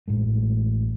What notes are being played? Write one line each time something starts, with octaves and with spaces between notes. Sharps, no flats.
A1 A2 G#3 A3